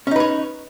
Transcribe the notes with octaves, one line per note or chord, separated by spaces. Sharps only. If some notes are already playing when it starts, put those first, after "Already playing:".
C#4 D#4 B4 C#5